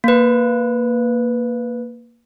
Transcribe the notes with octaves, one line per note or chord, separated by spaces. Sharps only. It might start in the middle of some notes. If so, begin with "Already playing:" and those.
A#3 B4